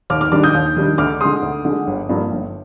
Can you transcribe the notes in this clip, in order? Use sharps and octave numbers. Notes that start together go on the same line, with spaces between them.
D#2 D6 F6
D6 F6
D#3 G3 D4 D6 F6
D#6 G6
D#2
D#3 G3 D4
D2 D6 F6
D3 G#3 C6 D#6
D2
D3 G#3
G1
G2 F3 A#3
G1